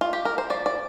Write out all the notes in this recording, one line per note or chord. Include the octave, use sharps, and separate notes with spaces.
F4
G4
A#4
C5
F3 D5
D5